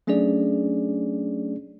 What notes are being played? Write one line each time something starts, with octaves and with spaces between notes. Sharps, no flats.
F#3 A3 C#4 D4 G#4 D5